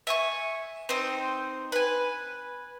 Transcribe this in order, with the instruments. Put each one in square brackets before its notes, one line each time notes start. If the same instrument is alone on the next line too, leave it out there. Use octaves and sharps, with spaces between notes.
[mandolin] E5 G#5 C#6
C4 D#4 C5
B4 G#5